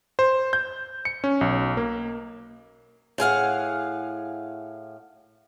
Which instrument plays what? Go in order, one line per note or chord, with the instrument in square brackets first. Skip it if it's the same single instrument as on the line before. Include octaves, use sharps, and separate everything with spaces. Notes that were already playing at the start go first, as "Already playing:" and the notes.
[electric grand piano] C5
G6
C#7
C#4
B1
A#3
[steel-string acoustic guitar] A2 G#4 F5 F#5